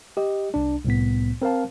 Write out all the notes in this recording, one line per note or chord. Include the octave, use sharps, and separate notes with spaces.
G4 D#5
C2 D4
C2 A2 B3 B6
C4 A#4 C5 F5 A5